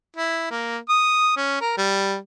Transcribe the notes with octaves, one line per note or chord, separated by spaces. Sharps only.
E4
A#3
D#6
C#4
A#4
G3